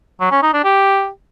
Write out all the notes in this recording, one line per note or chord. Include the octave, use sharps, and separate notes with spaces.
F#3
C#4
D#4
D4
G4